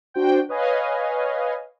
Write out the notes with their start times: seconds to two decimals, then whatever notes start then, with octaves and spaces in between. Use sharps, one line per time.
0.14 D4 F#4 C5 G5
0.49 B4 C#5 D#5 F5 G#5